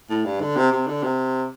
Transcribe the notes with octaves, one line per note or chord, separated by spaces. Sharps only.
A2
G2
D3
C3
C3
D3
C3